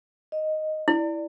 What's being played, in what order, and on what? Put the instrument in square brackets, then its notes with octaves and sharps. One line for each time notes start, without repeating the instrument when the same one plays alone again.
[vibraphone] D#5
[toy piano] E4 [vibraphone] D5